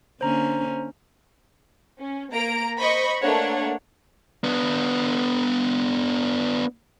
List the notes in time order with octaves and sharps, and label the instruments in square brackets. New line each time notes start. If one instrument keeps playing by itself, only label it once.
[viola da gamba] D3 A#3 C#4 [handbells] C5 A#5
[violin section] C#4
A#3 A#5 D7
C5 D#5 B5 C#6
A3 A#3 D4 B4 C#5 F#5
[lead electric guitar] B3 D4